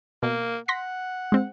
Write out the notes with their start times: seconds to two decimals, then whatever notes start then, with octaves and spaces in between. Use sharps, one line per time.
0.23 B2 A#3
0.68 F#5 C6 A#6 B6
1.32 G#3 C4